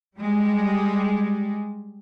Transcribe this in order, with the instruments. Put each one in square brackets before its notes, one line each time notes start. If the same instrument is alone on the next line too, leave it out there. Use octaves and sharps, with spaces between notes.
[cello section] G3 G#3